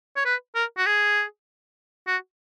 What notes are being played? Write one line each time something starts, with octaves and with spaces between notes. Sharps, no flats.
C#5
B4
A#4
F#4
G#4
F#4